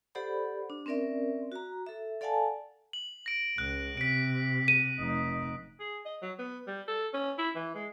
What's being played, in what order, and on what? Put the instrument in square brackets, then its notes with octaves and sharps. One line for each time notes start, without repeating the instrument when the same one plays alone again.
[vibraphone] G4 A4 C5 D5 F#5 B5
D4
C4 C#4 A#4 D5 E5
F#4 A#5
A4 E5
A4 D5 F5 F#5 G#5 A5
[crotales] F#7
A#6 D7
[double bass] C#2 [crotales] F#6
[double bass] C3 [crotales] B6 D7
[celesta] D#7
[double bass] F1 D#4
[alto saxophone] G#4
D#5
F#3
B3
G3
A4
C#4
E4
E3
G#3